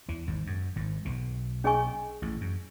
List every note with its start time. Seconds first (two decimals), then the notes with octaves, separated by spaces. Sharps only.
0.08 E2 E3
0.27 G#1 G#2
0.47 F#2
0.76 G#1 G#2
1.05 B1 B2
1.64 C#4 G#4 D#5 G#5 C#6
2.22 A1 A2
2.41 F#2